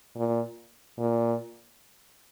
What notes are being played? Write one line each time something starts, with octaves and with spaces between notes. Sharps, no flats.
A#2
A#2